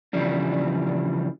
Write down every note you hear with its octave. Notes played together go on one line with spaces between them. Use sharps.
C#3 E3 F3 G3 D4